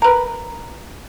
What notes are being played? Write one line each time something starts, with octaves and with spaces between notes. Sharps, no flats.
A#4 B4